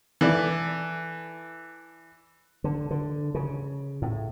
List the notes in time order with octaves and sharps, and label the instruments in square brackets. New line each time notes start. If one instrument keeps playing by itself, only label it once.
[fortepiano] E3 A4 D5 E5
[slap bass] D3
D3
C#3
A2